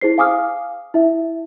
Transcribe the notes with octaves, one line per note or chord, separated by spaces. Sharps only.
E4 G#4 C5 C7
F5 G#5 D6 D#6 F6
E4 E5